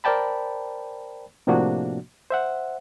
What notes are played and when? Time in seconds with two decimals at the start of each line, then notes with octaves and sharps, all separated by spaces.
0.04 A#4 C5 D5 G5 A5 B5
1.47 A2 C3 F3 A#3 D4 F#4
2.30 C5 E5 F#5